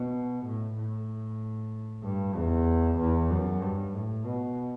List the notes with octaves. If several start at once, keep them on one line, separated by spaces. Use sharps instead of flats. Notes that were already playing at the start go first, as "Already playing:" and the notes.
Already playing: B2
A2
A2
G2
E2
E2
F#2
G2
A2
B2